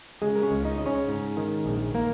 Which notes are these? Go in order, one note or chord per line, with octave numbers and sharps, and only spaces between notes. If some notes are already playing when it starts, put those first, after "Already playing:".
C#3 G#3 G#4
A#4
C#4 C#5
C#2
D#4 D#5
C#3 D#5
C#4 C#5
G#2
D#3
A#1
A#3 A#4